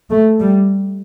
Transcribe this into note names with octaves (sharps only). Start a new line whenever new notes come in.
A3
G3